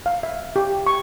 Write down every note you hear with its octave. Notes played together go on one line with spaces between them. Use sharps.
F5
E5
G4
C#6